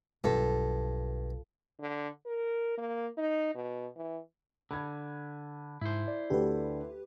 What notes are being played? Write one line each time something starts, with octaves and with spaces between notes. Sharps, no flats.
B1 G2 F4 A4
D3
A#4
A#3
D#4
B2
E3
D3 B5 G#6
G#2 E4 C5
D5
D2 G4 A4 B4